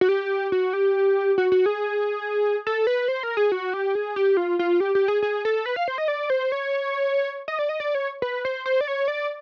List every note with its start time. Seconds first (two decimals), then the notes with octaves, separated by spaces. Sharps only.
0.01 F#4
0.09 G4
0.52 F#4
0.73 G4
1.38 F#4
1.52 F#4
1.66 G#4
2.67 A4
2.87 B4
3.08 C5
3.23 A#4
3.37 G#4
3.52 F#4
3.74 G4
3.95 G#4
4.16 G4
4.37 F4
4.59 F4
4.80 G4
4.95 G4
5.08 G#4
5.22 G#4
5.45 A4
5.66 B4
5.76 F5
5.88 C5
5.98 D#5
6.08 D5
6.30 C5
6.52 C#5
7.48 D#5
7.59 D5
7.69 D#5
7.80 D5
7.95 C#5
8.22 B4
8.45 C5
8.66 C5
8.81 D5
8.88 C#5
9.08 D5